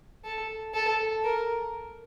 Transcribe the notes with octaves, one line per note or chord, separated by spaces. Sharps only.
A4
A4
A#4